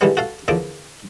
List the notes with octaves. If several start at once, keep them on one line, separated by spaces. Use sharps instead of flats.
D3 E3 G3 G#3 B3 C#4
F#4 A4 F5
E2 D3 F3 A#3 D6